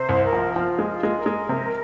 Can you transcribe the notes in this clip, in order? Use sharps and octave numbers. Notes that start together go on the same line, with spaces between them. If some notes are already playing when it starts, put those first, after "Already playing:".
Already playing: C3 C5
C2
A#4
F3
F3 F4
G#3
F4
G#3
A#4
G#3
C3